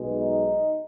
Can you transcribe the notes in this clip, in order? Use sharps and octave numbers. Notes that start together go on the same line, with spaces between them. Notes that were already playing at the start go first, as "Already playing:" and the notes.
Already playing: B1 B2 G#3
D#4